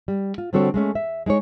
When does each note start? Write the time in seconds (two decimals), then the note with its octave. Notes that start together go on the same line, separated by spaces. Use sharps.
0.08 G3
0.38 F4
0.53 D3 G3 C4 F#4 A4 C#5
0.74 G#3 A3 C#4
0.95 E5
1.26 G#3 D#4 G#4 C#5